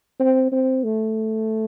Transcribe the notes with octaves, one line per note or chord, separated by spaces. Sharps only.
C4
C4
A3